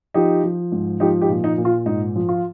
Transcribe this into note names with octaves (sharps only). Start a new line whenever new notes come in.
F3 D#4 G4
F3
G#2
F3 D#4 G4
D#4 G4
A#2
D#4
A#2
F4
G#2 D#4
F3
F4